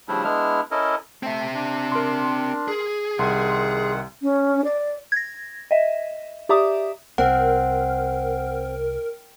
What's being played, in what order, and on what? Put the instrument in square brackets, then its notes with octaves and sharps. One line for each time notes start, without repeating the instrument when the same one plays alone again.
[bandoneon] C#3 F3 G3 A3 D4 E4
G#3 B3 D4 E4 F6
C#4 E4 A4 A#4 D#5
[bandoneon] A3 [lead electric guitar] C4 E5
[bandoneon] D4
[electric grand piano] A#4 C6
[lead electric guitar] G#4
[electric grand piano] C2 C6 [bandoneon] D#3 F#5
[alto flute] C#4
D5
[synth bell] G#6 A#6
D#5 E5
G4 D5 E5 A#5 D6 D#6
[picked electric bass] C2 [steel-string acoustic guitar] C4 [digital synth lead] A#4 [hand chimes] F#5